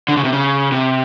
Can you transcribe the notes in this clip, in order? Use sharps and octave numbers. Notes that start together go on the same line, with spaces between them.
D3
C#3
C3
C#3
C3